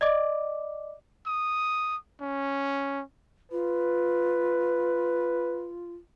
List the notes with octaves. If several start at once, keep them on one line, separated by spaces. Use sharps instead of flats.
D5 D#5 D6
D#6
C#4
F4 B4